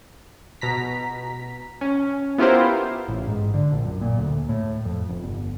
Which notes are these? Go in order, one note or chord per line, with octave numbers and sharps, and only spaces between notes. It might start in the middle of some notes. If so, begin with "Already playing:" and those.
B2 A#5 B6
C#4
B3 E4 F4 G4 A#4 C5
A1
G#2
D3
A#1
F#2
A#2
D2
A2
F2
F1
G1